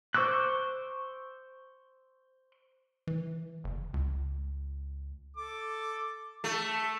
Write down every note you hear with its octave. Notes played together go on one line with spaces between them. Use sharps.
C5 C#6 D6 E6 F#6
E3
F#1
C#2
A4 D6
A3